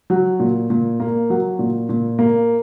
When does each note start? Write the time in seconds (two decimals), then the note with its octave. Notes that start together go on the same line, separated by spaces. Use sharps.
0.10 F#3
0.40 A#2
0.70 A#2
1.00 A#3
1.30 F#3
1.59 A#2
1.89 A#2
2.19 A#3